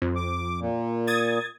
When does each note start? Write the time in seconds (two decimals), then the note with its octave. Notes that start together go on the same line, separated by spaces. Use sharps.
0.02 F2
0.16 D6
0.60 A#2
1.07 D#6 G#6 A6